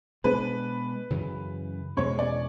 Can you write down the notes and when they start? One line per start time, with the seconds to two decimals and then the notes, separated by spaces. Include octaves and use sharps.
0.24 B2 G#3 B3 D4 B4
1.10 F#2 C#3 E3
1.97 E2 B2 G#3 C#4 C#5
2.19 D5